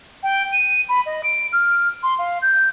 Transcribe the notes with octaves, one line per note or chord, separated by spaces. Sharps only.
G5
D#7
B5
D#5
D7
F6
C6
F5
G6